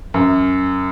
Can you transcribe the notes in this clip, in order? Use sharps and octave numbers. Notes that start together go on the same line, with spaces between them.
F#2